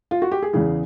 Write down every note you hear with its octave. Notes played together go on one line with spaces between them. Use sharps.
F4
F#4
G4
G#4
E2 C#3 E3 G#4